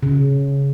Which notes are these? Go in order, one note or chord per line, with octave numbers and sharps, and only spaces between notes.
C#3